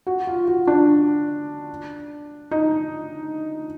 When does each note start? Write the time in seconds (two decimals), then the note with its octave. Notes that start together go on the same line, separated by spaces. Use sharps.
0.07 F#4
0.27 F4
0.48 F#4
0.67 D4
2.51 D#4